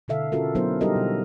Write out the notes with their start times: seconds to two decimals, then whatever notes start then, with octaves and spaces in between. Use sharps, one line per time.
0.08 B2 D3 A4 E5 F5
0.32 C#4 F4 F#4 A4 A#4
0.55 F#3 B3 D4 E4 A#4 C5
0.81 G3 D#4 G4 A4 A#4 D#5
0.96 B2